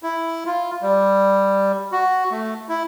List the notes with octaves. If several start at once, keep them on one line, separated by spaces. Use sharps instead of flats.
E4
F4
G3
F#4
A3
E4